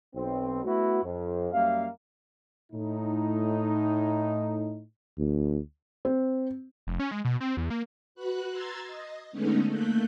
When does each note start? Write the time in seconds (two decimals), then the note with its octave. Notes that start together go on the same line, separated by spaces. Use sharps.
0.15 B1 C4
0.64 A3 B3 E4 F#4
1.04 F2
1.52 F#2 G3 A#3 E5 F5
2.73 A2 D#4
5.18 D2
6.05 C4
6.87 F1
6.99 C#4
7.11 G#3
7.25 B2
7.40 C4
7.57 E2
7.70 A#3
8.15 F#4 B4 F#6
8.49 A#5 C6 E6 G#6 A6
8.87 D#5
9.32 D3 G#3 A3 B3 C#4 D#4
9.70 A3 A#3 F#6 G6